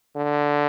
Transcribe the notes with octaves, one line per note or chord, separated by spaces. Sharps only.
D3